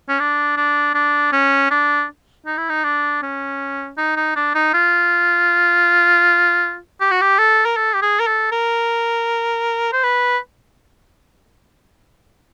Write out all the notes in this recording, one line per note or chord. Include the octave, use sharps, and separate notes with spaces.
C#4
D4
D4
D4
C#4
D4
D#4
E4
D#4
D4
C#4
D#4
D#4
D4
D#4
F4
G4
F#4
G4
A4
A#4
A4
G4
G#4
A#4
A4
A#4
C5
B4